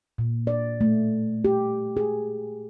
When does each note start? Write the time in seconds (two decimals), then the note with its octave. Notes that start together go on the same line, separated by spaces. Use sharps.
0.18 A#2
0.47 D5
0.81 A3
1.45 G4
1.97 G#4